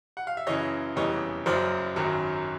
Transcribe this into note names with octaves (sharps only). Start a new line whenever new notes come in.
F#5
F5
E5
F#2 C#3 E3 C#5 D#5
F1 E2 C#3 E3 G3 C#5 D#5
F#1 F#2 C#3 F#3 C5 D5
G#1 F#2 D#3 F#3